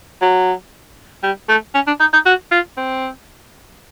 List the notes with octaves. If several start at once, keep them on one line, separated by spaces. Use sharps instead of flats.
F#3
G3
A3
C#4
D4
D#4
D#4
F#4
F4
C4